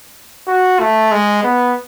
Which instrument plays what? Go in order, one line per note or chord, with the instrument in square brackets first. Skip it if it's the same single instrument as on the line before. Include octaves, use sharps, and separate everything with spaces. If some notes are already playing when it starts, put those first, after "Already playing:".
[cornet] F#4
A3
G#3
B3